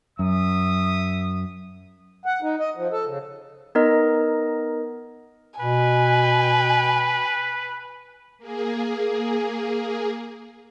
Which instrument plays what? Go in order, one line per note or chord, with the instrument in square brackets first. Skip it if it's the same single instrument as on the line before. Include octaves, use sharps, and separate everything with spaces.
[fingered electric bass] F#2 [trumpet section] E5 D#6
[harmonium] F#5
D#4
D#5
F3
A4
C#3
[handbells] B3 D#4 A#4 D#5
[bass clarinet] B2 [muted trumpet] B4 [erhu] G#5
[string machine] A#3 G#4